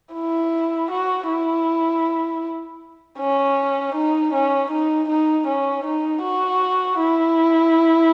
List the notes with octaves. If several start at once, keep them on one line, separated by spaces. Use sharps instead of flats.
E4
F#4
E4
C#4
D#4
C#4
D#4
D#4
C#4
D#4
F#4
E4